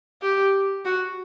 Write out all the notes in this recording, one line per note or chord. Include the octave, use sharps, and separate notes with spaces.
G4
F#4